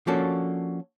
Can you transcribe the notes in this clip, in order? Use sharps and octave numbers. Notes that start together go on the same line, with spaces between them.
F3 A#3 C#4 D4 F#4 A4